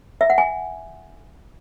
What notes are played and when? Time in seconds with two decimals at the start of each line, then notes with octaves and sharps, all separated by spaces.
0.21 E5
0.30 F#5
0.38 G#5